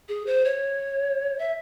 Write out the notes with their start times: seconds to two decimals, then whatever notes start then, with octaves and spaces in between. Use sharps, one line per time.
0.09 G#4
0.26 C5
0.45 C#5
1.39 E5